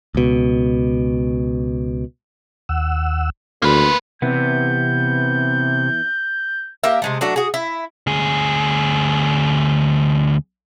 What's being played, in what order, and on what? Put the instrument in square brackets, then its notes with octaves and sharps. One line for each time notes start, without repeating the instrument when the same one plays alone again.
[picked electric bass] C#2 B2
[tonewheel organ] D#2 F#5 E6
[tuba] D2 [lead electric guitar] A#3 B4 [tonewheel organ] C6
[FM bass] C3 [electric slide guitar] E3 B3 [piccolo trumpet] G6
[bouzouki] A#3 G4 A#4 E5
C3 G#3 A3
F#3 A3 D4 F#4
F#4 G#4
E4
[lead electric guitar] D2 G#4